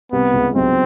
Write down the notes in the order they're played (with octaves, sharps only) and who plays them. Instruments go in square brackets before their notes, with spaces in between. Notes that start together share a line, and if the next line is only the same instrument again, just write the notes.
[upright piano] C2 C3 [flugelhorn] B3
[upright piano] C#2 C#3
[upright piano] B1 B2 [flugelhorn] C4